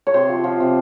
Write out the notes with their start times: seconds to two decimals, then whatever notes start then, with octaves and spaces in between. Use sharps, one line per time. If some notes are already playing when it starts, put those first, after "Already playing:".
0.07 C#5
0.14 C3 C5
0.29 F3
0.44 F3
0.60 C3